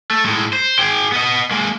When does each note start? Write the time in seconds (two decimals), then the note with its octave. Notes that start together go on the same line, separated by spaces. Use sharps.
0.11 A3
0.25 A2 G#3
0.53 C5
0.79 G#4 G5
1.12 B3 D#5
1.51 G#3 A#3